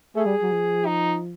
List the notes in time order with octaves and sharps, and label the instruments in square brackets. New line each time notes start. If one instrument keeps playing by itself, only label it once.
[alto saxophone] A3 [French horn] G#4
[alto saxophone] G3
F#3
F3
[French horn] D#4